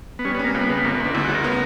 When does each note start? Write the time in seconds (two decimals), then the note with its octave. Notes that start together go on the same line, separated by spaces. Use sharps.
0.19 B3
0.25 G3 C#4
0.35 B3
0.39 C#4
0.44 A#3
0.54 C#2 B3
0.69 C#3 B3
0.84 G1 A#3
0.95 B3
1.00 G1 D4
1.14 D2 E4
1.24 F#4
1.29 C#3
1.34 A#4
1.44 B3